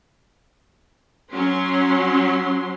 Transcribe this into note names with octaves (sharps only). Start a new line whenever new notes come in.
F#3 C#4 C6